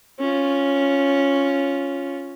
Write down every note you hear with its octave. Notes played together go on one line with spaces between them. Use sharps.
C#4 F4